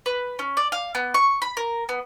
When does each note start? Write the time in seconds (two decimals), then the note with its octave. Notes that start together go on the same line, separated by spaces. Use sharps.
0.06 B4
0.39 C#4
0.57 D5
0.72 F5
0.95 B3
1.14 C#6
1.42 B5
1.57 A#4
1.89 B3